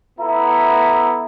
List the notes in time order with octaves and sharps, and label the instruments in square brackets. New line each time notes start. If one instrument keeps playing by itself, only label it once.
[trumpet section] B3 E4 A4 E5 A#5